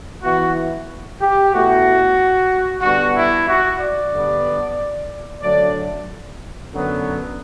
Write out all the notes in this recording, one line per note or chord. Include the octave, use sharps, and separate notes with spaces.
E3 B3 E4 F#4
G4
B2 A3 E4 F#4
D3 G3 B3 D4 F#4
E4
F#4
D5
G2 D3 G3 B3 D4
D3 F#3 A3 D4 D5
F#2 D3 F#3 B3